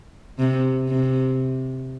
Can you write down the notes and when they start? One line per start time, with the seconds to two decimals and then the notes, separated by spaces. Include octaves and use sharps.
0.39 C3
0.89 C3